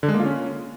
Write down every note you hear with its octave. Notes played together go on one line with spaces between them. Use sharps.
D3
G#3
A#3
F4
C#4